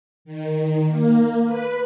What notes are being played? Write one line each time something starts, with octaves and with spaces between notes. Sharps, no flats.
D#3
A#3
B4